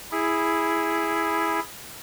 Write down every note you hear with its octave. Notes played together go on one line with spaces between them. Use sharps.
E4 G#4